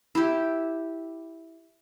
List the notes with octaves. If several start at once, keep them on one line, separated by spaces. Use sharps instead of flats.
E4 G4